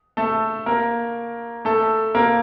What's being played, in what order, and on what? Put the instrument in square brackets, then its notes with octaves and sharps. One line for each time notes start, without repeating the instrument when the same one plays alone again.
[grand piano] A3 A4
A#3 A#4
A3 A4
A#3 A#4